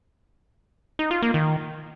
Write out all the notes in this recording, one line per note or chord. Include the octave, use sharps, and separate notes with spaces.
D#4
F4
A#3
D#3